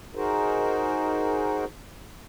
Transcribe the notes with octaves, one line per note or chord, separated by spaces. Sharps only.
D#4 F#4 G#4 A#4 C5